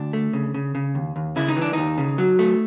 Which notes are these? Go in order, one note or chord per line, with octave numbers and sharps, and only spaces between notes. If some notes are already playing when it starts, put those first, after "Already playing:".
Already playing: D2 D4
A3
C#3
C#3
C#3
D#2
D#2
C#3 E4
D#4
E3
D4
D#2 D#4
C#3
F#3
A3